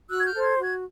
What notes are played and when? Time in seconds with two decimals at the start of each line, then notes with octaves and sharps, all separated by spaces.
0.10 F#4 E6 F#6
0.19 G#6
0.25 F6 G6
0.34 A4 C5
0.42 G#6
0.58 F#4 G#6